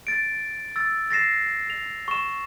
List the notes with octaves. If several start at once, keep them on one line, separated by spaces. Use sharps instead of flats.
A6 D7
E6 A6
A6 A#6 C7 E7
F7
C#6 E7